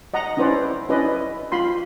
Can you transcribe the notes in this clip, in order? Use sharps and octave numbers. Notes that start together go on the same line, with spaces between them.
D#5 F#5 A#5
C#4 D4 E4 B4 C5 D5
C#4 D4 E4 B4 D5 D#5
F4 B5 C6